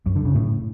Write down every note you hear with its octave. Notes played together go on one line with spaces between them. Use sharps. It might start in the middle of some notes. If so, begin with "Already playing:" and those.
F#2
D3
C#3
A2